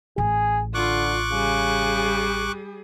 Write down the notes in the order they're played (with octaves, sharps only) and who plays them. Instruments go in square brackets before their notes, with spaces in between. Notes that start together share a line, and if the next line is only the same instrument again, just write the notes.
[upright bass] A1 [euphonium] G#4
[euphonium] D3 [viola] F4 [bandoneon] C#6 D6 F#6
[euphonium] C#3 [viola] G3 G#4